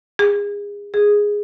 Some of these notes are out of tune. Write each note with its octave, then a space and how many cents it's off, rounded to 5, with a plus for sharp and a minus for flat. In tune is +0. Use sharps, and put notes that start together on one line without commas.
G#4 -30
G#4 -5